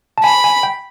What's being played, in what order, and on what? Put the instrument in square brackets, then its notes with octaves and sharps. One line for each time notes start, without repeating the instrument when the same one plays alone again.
[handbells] A5
[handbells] G#5 [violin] B5
[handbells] G#5
G5